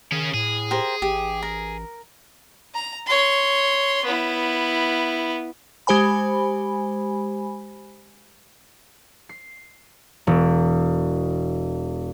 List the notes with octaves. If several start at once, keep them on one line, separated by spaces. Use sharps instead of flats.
D#3 C#4 G#4
A2 G#4
G4 A#4 C5
A1 G4
A#4
A#5
C#5 C6
B3 E4
G#3 G4 C5 G#5 B5
C7
E1